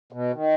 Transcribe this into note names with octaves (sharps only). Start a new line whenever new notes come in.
B2
D#3